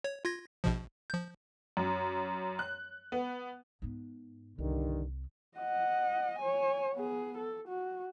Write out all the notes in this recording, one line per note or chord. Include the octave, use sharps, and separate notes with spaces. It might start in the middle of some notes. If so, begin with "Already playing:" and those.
C#5
F4 G#6 A#6
A#1 B2 F3
F3 G6
F#2
F#6
B3
G#2 B3
C2 G2 D3 D#3
D#5 F#5
C#5 G#5
B3 G#4
A4
F#4